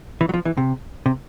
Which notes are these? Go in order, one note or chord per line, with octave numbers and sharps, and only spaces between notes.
E3
F#3
F3
E3
C3
C3